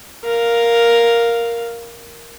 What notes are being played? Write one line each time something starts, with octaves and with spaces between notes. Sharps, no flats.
A#4 F5